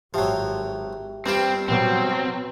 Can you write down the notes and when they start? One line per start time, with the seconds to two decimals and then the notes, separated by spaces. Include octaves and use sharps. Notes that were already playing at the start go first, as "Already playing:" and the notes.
0.14 G#1 F3 F#3 G4 E5 G5
1.26 G2 G3 C4 F4
1.68 B2 F#3 C4